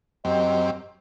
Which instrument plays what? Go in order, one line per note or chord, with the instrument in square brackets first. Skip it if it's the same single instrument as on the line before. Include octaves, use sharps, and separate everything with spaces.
[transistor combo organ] F#2 C4 G4 [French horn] D#5